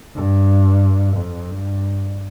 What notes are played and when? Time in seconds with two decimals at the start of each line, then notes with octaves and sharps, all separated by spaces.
0.15 G2
1.17 F2
1.51 G2